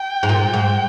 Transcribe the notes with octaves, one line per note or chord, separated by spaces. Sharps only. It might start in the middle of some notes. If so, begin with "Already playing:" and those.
Already playing: G5
G#2
A#2
G#2